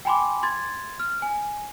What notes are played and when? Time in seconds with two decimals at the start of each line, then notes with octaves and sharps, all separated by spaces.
0.05 G5 G#5 B5 C6 D6
0.43 C6 G#6 A6
0.99 F6
1.22 G#5